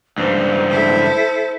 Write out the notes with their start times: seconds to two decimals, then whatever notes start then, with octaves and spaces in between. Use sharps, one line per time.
0.18 C#2 G2 C5
0.70 E4 A4